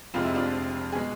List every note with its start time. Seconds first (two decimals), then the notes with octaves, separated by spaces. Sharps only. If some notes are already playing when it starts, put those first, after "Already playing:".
0.14 F1 F2 C3 G#3 F4
0.24 E4
0.35 D4 F4
0.92 G#4
0.95 B2 G#3